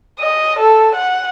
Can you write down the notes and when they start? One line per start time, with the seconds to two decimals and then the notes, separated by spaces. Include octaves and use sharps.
0.19 D#5
0.59 A4
0.95 F#5